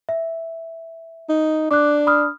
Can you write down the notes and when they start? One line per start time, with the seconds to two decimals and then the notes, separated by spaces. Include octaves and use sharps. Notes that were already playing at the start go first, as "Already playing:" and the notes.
0.09 E5
1.29 D#4
1.71 D4 D6 F#6
2.07 B5 D#6 F6